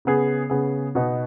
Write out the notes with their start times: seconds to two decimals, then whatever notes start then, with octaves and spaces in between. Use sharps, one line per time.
0.05 C#3 B3 G#4
0.50 C#3 B3 G#4
0.95 B2 B3 D#4